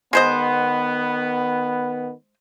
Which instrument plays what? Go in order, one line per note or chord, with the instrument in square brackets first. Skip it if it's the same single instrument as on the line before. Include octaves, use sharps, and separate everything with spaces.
[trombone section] D#3 B3 [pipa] G#3 C5 D#5